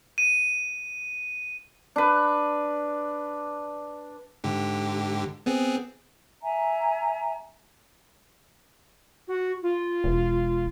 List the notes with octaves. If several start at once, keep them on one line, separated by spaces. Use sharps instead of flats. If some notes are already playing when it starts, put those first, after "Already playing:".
D#7
D4 B4
G#2 D3 G4
B3 C4 G#4
E5 G#5 A#5
F#4
F4
E1